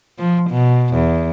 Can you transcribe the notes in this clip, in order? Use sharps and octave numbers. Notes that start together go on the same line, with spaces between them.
F3
B2
E2